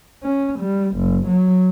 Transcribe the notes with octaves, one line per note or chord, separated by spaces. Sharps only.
C#4
G3
F#1
F#3